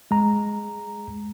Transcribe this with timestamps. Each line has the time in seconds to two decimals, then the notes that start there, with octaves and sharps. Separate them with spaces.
0.11 G#3 A#5